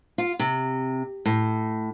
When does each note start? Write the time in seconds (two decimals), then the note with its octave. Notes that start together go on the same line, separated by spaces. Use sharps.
0.18 F4
0.39 C3
1.25 A2